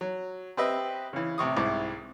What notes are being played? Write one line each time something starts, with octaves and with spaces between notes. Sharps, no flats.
F#3
C4 G4 B4 D#5 E5
C#3 E3
A1 C3 C#6 D#6
C2 G#2 E4 D6